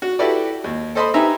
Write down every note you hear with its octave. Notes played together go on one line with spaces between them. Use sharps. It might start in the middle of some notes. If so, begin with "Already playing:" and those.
F#4
E4 F#4 G4 A4 B4 D5
D#2
A4 C5 D#5 B5 C6
D#4 G4 B4 E5 G#5 A#5